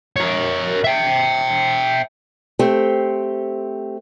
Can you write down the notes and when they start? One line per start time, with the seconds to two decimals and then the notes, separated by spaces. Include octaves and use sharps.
0.16 A#4 C#5
0.84 E5 G5
2.59 A3 C4 G4 C5